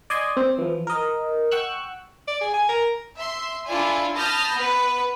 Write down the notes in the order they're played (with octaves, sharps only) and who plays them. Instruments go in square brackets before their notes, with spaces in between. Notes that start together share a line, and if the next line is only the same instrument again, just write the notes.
[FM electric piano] D5 D#5 G#5 C6
C4
E3 F3
A#4 D#5
F#5 G5 C#6 E6 F#6
[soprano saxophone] D5
G#4
G#5
A#4
[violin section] E5 C6
D4 E4 F4 A4 D5 G#5
A5 B5 D#6 F6 G6 A#6
B3 B4